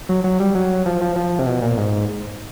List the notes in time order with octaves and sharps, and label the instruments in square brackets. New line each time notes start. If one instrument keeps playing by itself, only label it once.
[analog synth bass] F#3
F#3
G3
F#3
F3
F3
F3
C3
B2
A#2
G#2